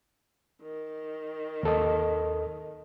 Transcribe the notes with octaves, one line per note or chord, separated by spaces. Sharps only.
D#3
D#2 A4 D#5